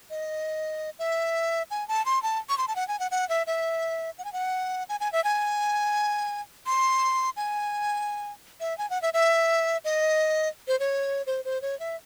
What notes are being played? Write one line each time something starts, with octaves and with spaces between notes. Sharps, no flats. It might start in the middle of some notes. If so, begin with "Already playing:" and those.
D#5
E5
G#5
A5
C6
A5
C#6
C6
A5
F#5
G#5
F#5
F#5
E5
E5
F#5
G#5
F#5
G#5
G#5
E5
G#5
C6
G#5
E5
G#5
F#5
E5
E5
D#5
C5
C#5
C5
C5
C#5
E5